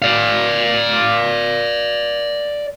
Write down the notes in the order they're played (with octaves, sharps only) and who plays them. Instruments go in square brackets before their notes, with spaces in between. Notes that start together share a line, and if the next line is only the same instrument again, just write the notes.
[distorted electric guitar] D5 F5